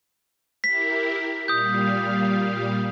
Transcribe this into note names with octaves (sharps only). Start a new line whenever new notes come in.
E4 G4 A#4 B6
A#2 G3 F5 D#6 G6